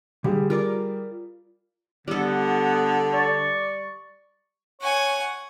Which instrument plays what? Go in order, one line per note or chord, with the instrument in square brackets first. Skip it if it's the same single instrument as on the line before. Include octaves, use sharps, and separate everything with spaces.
[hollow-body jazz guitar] D3 [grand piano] G3 G4 G#4
[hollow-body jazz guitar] F4 A#4 D5
[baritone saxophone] D3 [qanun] G3 A4 [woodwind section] B3
[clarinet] D5 [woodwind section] C#6
[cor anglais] C#5 [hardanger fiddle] F#5 G#5